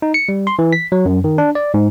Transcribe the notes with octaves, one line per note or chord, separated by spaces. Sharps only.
D#4
C#7
G3
C6
E3
B6
F#3
F#2
D#3
D4
D5
G#2